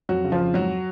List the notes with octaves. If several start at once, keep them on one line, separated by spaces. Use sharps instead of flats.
F2 F#3 F#4
C#3
F3 F4
F2
G#2 F#3 F#4